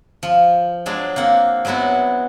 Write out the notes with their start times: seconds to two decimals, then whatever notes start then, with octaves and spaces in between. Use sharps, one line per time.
0.23 F3
0.86 F#3 G#3 D4
1.16 A#3 C4 F#5
1.65 F#3 G#3 B3 E4 F#4